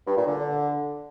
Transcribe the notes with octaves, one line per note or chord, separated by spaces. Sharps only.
G2
A#2
D3